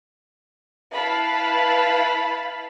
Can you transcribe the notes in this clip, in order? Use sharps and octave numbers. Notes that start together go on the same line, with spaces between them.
E4 B4 F5 A5 B5